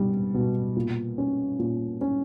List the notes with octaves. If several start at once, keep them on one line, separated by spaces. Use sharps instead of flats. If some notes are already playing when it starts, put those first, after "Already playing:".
Already playing: B2 G3
B2
A#2
C#4
A#2
C#4